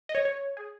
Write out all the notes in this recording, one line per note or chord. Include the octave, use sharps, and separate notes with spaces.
D#5
C#5
C#5
G#4